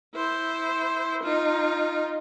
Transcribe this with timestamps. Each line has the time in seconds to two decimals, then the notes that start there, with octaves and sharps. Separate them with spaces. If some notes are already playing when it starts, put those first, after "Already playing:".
0.15 E4 C5
1.23 D#4 F4